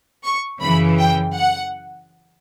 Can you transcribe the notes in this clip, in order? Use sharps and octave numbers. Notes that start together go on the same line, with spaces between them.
C#6
F#2 C#3 E3 B5
G5
F#5